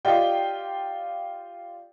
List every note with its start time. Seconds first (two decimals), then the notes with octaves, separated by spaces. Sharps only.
0.05 F4 G4 D5 D#5 G5